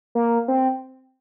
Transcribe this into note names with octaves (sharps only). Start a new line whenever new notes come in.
A#3
C4